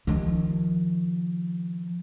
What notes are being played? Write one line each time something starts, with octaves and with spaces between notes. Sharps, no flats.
D#3 F3